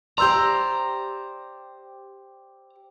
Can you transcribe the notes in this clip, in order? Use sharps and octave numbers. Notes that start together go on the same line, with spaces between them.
G4 C5 D5 A#5 C6 E6 G6